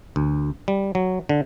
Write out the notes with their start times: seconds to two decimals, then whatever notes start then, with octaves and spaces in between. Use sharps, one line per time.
0.16 D2
0.68 G3
0.95 F#3
1.29 D3